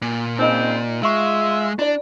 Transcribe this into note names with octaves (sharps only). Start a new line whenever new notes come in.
A#2
C#3 C4 D#4 D#5
G#3 F4 E5 F5 C#6
D4 E4 D5